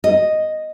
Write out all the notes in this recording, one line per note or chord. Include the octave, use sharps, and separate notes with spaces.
D#5